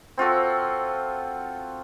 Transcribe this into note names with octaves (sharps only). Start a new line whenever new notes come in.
C4 F4 F#4 A4